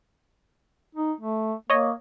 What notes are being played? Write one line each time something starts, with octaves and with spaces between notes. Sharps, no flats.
D#4
A3
A#3 C#5 D#5